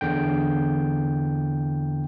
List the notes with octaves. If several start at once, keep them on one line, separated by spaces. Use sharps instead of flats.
E2 D3 G5